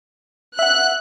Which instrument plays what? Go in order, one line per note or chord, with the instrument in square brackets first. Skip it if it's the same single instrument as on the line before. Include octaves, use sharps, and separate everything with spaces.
[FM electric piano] E5 F#5 [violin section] F#6